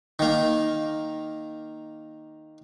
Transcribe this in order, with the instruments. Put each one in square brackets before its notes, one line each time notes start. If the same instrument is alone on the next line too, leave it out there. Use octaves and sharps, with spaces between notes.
[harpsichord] D#3 A#3